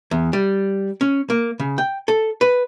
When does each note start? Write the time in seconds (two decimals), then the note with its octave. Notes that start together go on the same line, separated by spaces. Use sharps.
0.11 E2
0.33 G3
1.01 C#4
1.30 A#3
1.60 C#3
1.78 G5
2.08 A4
2.41 B4